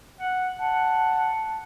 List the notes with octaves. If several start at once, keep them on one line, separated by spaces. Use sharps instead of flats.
F#5
F#5 A5